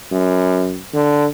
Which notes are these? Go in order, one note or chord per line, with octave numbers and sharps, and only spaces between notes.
F#2
D3